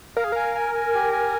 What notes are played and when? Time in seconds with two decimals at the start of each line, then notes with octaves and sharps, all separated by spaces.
0.17 A#4 F5
0.24 G#4
0.32 A#4 G#5
0.55 G#5
0.74 G#5
0.94 G4
1.13 G#5